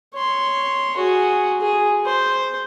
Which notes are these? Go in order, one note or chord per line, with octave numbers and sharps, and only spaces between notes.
C#5 C6
F#4 G#4
G#4
C5